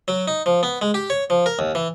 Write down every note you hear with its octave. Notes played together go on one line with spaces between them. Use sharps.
F#3
D#4
F3
B3
G#3
G4
C#5
F3
A#4
D#2
E3